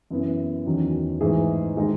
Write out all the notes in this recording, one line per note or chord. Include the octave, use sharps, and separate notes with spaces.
F#2 E3 B3 E4
E2 D#3 F#3 C#4
G#2 E3 A3 D#4 G#4
D#3 G#3 D#4